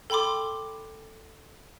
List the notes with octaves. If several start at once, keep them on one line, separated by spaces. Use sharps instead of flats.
A4 G5 B5 C6 D6